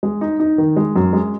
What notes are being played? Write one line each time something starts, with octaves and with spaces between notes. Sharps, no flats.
G#3
D#4
D#4
D#3
G#3
F#2
G#3